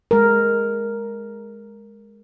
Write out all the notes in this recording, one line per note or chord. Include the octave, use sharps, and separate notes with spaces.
G#3 A#4